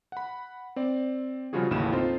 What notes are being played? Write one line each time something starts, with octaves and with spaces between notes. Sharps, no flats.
F#5 B5
C4 D5
C#3 F3 G3 F4 F#4 G#4
A1 D#2 A2 C#3 B5 E7
C4 D#4 F4 A4 C5